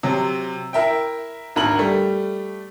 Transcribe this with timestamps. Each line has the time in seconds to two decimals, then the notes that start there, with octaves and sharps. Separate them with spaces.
0.03 C3 F#3
0.73 E4 A#4 E5 G5
1.56 G#1 D2 A#5 F#7
1.79 G3 A3